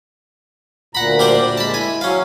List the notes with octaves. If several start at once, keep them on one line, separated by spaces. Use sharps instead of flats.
D2 A#2 F#5 A#5 B5
G3 D4 C5
G#3 A5 B5
E4 G#5
F#3 C#4 F5